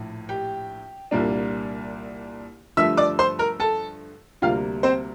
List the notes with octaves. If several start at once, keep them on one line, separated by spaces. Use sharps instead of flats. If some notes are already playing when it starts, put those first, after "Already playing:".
Already playing: A#1 A2
G4 G5
C2 A#2 G3 A#3 D4
G2 D3 F3 A3 E5 E6
D5 D6
C5 C6
A#4 A#5
A4 A5
D2 C3 G3 A#3 F4 F5
C4 C5